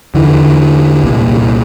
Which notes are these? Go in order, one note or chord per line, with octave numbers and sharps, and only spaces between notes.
E2 D3 E3
C2 A#2